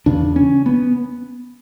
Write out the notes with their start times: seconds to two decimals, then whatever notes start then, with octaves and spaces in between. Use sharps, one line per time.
0.06 E2 C#3 D4
0.36 C#4
0.66 B3